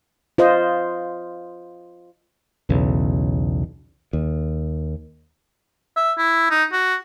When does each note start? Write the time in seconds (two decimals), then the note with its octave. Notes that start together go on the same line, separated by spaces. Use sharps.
0.38 F4 C5 D#5
2.69 B1 E2 C#3
4.13 D#2
5.96 E5
6.18 E4
6.50 D#4
6.72 F#4